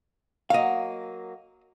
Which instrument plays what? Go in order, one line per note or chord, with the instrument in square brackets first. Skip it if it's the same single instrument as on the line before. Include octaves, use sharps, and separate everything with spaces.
[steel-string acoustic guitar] F#3 A#3 [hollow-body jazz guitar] D#5 F5